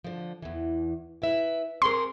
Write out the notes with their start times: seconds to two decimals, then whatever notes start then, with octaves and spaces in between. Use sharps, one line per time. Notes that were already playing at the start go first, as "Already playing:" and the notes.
0.04 D3 F3
0.42 E2 E3
1.22 E4 B4 E5
1.82 C4 G#4 A#4 C6